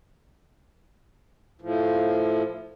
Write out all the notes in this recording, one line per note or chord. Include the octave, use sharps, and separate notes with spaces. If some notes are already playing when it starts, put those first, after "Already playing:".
A2 F3